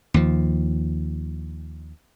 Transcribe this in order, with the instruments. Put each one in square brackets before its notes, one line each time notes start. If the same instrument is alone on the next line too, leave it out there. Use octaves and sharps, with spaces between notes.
[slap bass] D#2 F3